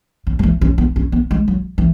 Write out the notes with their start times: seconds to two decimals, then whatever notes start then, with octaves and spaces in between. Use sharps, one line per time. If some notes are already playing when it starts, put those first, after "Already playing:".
0.27 C#3
0.39 F#3
0.43 E3
0.61 C#4
0.78 B3
0.96 C#4
1.12 B3
1.31 G#3
1.48 F#3
1.78 E3